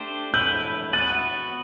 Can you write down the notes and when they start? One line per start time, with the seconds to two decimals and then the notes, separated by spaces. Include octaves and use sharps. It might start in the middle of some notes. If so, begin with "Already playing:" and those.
Already playing: A3 D4 G4 C5
0.34 A3 E4 B4 E6 G6
0.93 B3 F#4 B4 F#6 A6